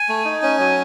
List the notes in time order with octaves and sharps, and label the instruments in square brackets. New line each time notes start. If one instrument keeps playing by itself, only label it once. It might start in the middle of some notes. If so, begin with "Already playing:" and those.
Already playing: [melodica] G#5
A3
D#4
C#4
F#3